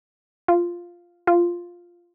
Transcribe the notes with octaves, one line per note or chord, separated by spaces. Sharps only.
F4
F4